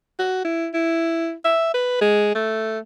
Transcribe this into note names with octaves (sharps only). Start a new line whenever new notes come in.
F#4
E4
E4
E5
B4
G#3
A3